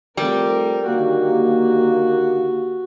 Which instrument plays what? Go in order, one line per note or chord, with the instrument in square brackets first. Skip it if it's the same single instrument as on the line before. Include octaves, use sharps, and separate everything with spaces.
[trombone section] F3 A3 C4 [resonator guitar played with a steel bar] G3 [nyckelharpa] A#4
[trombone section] D3 D#3 A#3 [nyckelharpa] F#4 [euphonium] G4